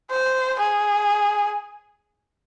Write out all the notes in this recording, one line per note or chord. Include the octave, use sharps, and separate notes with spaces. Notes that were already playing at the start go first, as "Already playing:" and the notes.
C5
G#4